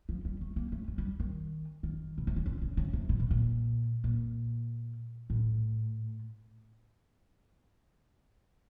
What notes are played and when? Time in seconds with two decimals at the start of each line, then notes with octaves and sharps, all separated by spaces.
0.09 F3
0.25 G3
0.41 A3
0.56 A#3
0.72 A3
0.88 G#3
0.98 G3
1.20 D#3
1.83 D#3
2.18 B2
2.27 C3
2.36 C#3
2.46 D3
2.62 C#3
2.77 C#3
2.93 C3
3.09 B2
3.20 B2
3.31 A#2
4.04 A#2
5.30 A2